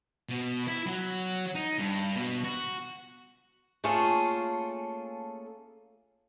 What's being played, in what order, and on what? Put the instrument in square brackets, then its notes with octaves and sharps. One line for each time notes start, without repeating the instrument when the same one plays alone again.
[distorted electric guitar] B2
E4
F#3
D#4
G2
B2
F#4
[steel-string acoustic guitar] A3 A#3 C#4 F4 G#4 A4